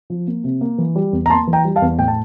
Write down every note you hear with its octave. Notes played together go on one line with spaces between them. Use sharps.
F3
A#3
C3
A#3
E3
G3
E2
A#5
A#3 A5 C6
E3
G5 A#5
G3
F5 A5
E2
A2 G5
A5